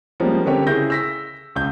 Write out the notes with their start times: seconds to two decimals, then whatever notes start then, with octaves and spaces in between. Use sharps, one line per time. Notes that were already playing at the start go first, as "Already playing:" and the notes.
0.20 F3 G3 G#3 A#3 B3 C#4
0.46 D3 C4 C#4 G4 A#4 C#5
0.67 C#3 E4 G#4 G6 A#6
0.90 E6 A#6 B6
1.56 C#2 G6